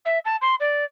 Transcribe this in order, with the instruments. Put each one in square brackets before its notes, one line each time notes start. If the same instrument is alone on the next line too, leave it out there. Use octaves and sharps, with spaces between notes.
[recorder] E5
A5
C6
D5